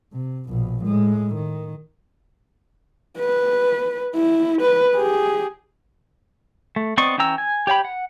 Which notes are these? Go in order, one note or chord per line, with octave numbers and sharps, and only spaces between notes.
C3
A#1 B2
A2 G#3
D#3
B4
E4
B4
G4 G#4
A3
B3 C4 D5 D#5 C#6
E3 C#4 G5 A#5 E6
G#5
G4 C#5 G5 B5
F#5